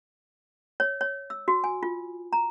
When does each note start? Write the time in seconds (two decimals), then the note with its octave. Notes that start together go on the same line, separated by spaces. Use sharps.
0.80 C#5
1.01 C#5
1.30 E6
1.48 F#4
1.64 G#5
1.83 F4
2.33 A#5